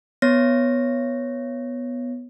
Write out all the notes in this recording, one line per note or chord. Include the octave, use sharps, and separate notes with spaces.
B3 C#5 A#6